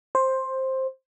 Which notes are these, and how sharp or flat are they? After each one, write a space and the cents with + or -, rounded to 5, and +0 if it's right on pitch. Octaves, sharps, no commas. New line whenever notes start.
C5 +10